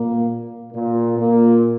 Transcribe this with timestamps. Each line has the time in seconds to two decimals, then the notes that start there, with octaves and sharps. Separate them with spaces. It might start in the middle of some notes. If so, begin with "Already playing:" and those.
Already playing: A#2 A#3
0.73 A#2 A#3
1.17 A#2 A#3